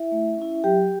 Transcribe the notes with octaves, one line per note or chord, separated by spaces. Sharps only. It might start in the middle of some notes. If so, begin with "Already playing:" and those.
Already playing: E4 E5
A3
C#4 E4
F#3 G4 G5